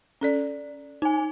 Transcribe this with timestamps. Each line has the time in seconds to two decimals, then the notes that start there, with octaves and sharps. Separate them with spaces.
0.21 C#4 A4 D5
1.02 D#4 G#5